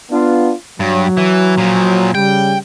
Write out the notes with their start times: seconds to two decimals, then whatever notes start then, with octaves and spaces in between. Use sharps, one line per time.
0.11 B3 D4 F4
0.80 G2 F#3
1.17 E3
1.58 A#2 F3
2.15 C#3 G3 G5